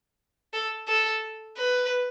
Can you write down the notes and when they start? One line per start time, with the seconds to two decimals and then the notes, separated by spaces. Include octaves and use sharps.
0.53 A4
0.88 A4
1.57 B4